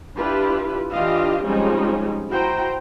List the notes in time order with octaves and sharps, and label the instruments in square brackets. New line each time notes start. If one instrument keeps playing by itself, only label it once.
[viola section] D4 E4 F4 G4 B4
E3 D4 F4 G4 D#5 F5
F3 G3 G#3 C4 C#4 D#4
E4 F#4 C5 G5 A#5